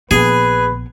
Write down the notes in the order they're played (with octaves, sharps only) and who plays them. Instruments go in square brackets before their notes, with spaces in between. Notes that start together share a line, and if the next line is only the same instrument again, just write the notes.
[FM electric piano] A#1 [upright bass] B3 [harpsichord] G#4 [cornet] B4